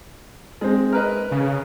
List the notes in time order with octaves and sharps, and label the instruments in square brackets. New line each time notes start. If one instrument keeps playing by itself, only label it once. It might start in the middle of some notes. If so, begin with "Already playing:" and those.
[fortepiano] G#3 C4
A#4 B4 D#5
[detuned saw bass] C#3